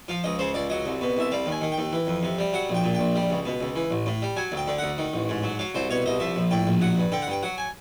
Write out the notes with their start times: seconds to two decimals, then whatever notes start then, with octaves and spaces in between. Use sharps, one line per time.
0.08 F3 F5
0.24 C#2 D#5
0.39 C#3 C5
0.54 C#2 D5
0.70 F#3 D#5
0.86 C2
1.01 B2
1.17 C2 E5
1.32 G3 F5
1.46 D#2
1.52 G#5
1.61 D#3
1.72 G5
1.78 D#2
1.92 E3
2.07 F2
2.23 C3
2.39 G3
2.53 F#3 F#5
2.70 A#1
2.75 G5
2.84 A#2
2.95 A#1 G5
3.15 G3
3.30 C#2
3.46 B2
3.60 C#2
3.76 E3
3.91 A1
4.06 A2
4.22 G3
4.37 F#3 G#5
4.52 D2
4.57 G5
4.67 D3
4.78 D2 F#5
4.98 D#3
5.13 A1
5.29 G#2
5.44 F#3
5.59 F#3 F5
5.75 C2 C5
5.90 B2 C#5
6.06 C2 D#5
6.20 F3 E5
6.36 A#1
6.51 A2 G5
6.67 A#1
6.81 F#3 F#5
6.98 G2
7.12 D3 G5
7.22 F#5
7.27 G2 G5
7.43 F#3 F#5
7.58 G#5